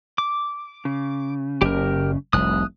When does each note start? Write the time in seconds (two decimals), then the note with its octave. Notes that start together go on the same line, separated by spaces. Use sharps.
0.18 D6
0.85 C#3
1.62 F#1 G4 A#4
2.33 F1 C2 D#6 F#6